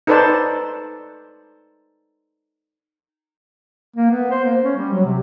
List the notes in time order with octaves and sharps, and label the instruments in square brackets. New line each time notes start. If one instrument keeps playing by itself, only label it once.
[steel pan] D#4 A4 B4 C5 D5 A5
[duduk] A#3
B3
C5
A#3
C#4
G3
F#3
C3